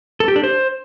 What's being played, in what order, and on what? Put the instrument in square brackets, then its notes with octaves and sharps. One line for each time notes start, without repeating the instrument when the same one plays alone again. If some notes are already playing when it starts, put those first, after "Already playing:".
[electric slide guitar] A4
G4
D4
C5